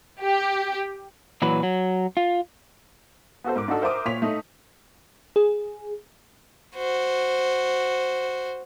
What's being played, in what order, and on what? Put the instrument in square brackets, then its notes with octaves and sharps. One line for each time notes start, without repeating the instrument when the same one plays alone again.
[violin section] G4
[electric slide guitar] A#2 E3 F#3 B4
F#3
F4
[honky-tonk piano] B3 F#4 A4 C5
G#2 A#4 D6
D4 D#4 F#4 A4
A#4 C5 E5 D6 D#6
A#2 C#5 B6 F7
A3 D#4
[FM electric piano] G#4
[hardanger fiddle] F#4 C5